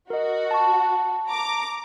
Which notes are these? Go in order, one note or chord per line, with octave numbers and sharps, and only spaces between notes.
F#4 A#4 D#5
A5 C#6
A#5 D6